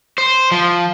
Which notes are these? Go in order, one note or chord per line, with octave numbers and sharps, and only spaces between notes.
C5
F3